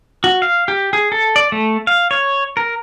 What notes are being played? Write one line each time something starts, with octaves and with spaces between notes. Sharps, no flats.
F#4
F5
G4
G#4
A4
D5
A3
F5
C#5
A#4